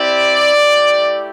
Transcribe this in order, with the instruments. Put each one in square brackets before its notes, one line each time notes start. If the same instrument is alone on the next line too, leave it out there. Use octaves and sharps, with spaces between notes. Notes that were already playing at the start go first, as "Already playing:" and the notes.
Already playing: [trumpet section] C4 E4 G4 D5
A3 E4 G4